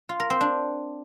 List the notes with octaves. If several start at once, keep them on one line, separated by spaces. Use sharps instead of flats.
F4
A#4
C4
D4